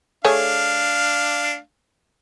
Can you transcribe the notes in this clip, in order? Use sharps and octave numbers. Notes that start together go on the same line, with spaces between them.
A3 D4 G#4 C#5 F5